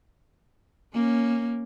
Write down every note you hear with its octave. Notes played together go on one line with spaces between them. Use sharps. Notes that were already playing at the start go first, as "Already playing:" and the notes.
A#3 C#4